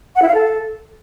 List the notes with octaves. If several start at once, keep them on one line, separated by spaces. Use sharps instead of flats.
F#5
E4
F5
A4